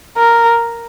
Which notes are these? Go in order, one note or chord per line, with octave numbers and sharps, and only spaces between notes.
A#4